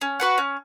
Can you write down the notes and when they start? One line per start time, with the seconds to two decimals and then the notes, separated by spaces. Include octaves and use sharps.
0.01 C#4
0.20 F#4 B4 F#5
0.38 C#4